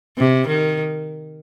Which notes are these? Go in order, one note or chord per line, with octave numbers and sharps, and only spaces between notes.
C3
D#3